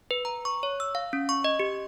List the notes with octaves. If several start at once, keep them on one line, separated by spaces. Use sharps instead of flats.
B4
A#5
C#6
C#5
E6
F5
C#4
C#6
D#5
G4